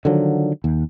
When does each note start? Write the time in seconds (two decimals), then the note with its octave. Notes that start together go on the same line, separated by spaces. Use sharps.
0.05 D3 D#3 F3 F#3
0.64 D#2